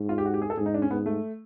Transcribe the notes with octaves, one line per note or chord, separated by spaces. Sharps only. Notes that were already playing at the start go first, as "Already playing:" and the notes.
Already playing: G#2
F4
G4
F#4
G4
G#4
A4
G#2 G#4
D#4
D4
C#4
G#2 B3
A3